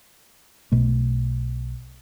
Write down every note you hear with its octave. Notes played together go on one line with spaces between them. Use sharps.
B1 B2 A3